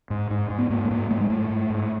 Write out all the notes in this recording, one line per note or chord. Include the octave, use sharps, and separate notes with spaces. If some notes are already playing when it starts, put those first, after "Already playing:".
G#2
G#2
G#2
B3
G#2 A#3
A3
G#2 A#3
G#2 A3
G#3
G#2 A3
G#2
G#2